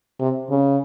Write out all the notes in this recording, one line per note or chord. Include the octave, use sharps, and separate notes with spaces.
C3
C#3